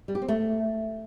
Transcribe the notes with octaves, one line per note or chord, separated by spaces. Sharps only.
G3
G4
C4
A3